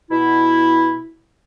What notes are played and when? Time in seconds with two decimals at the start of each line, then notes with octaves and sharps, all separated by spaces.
0.11 B2 E4